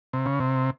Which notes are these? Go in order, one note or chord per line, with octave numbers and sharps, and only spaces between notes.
C3
C#3
C3